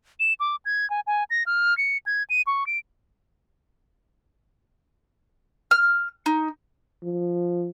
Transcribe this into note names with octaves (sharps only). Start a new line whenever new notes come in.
E7
D6
G#6
G#5
G#5
A#6
F6
C#7
G#6
D#7
C#6
D7
F6
D#4
F3